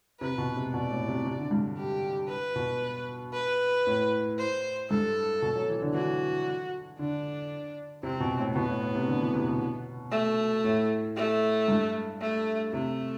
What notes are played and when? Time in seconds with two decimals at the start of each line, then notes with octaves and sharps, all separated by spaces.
0.20 C3 B4
0.38 B2
0.56 C3
0.73 B2 D5
0.90 A2
1.08 C3
1.25 C3
1.39 D3
1.51 G2
1.77 G4
2.29 B4
2.56 B2
3.33 B4
3.87 A2
4.39 C5
4.90 G2 A4
5.42 B2
5.55 F#3
5.69 E3
5.82 D3
5.94 E3 F#4
6.99 D3 D4
8.03 C3 C4
8.20 B2
8.38 A2
8.56 B2 B3
8.68 A2
8.82 A2
8.95 C3
9.07 D3
9.20 E3
9.34 C3
9.47 B2
10.12 A3
10.64 A2
11.16 A3
11.68 G2
12.21 A3
12.73 C3 A3